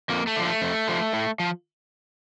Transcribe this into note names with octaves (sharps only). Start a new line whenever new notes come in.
F2 A#3
A3
D3 F3
A3
F2
D3 F3
A2
F3